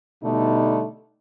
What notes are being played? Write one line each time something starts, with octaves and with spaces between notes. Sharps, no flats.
B2 D3 G3 A3 D#4